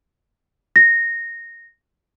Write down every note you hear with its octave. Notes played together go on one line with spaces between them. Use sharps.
A#6